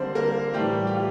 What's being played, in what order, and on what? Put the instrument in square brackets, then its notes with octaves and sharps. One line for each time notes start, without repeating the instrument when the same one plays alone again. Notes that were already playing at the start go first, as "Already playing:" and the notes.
Already playing: [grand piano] D3 G3 A#3 C4 C5
A#3 A#4
A2 E3 G3 A3 G4
G4
F4